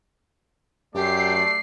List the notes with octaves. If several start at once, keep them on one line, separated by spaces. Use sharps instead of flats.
F#2 A3 G4 D5 C7